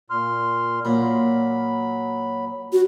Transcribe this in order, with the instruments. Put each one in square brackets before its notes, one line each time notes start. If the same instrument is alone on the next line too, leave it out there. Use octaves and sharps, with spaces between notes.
[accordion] A#2 C6 F6
[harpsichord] A#2 [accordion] F#3 B5
[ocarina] F#4